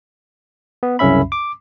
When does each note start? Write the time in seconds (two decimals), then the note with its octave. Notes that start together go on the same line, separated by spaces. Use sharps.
0.83 B3
0.99 C2 F#2 C#3 C#4 E5 B5
1.32 D6